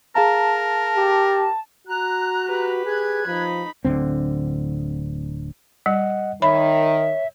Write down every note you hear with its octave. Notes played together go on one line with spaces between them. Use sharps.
G#4 A#4 F5 A5 A#5
G4
F#4 A#5 F#6
G4 B4
G#4 F#6 G#6
F3 D#4 B5
D1 A#1 D3 C4
G3 D#5 F#5
D#3 C#5 E5 B5